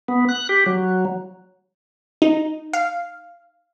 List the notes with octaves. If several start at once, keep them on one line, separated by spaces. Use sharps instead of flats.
B3
F#6
G4
F#3
D#4
F5